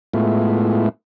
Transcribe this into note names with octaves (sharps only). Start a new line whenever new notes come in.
A2 G#3 A3 B3 E4 F4